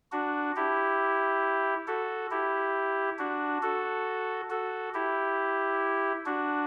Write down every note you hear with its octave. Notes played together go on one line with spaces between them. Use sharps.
D4 F#4
E4 G4
F#4 A4
E4 G4
D4 F#4
F#4 A4
F#4 A4
E4 G4
D4 F#4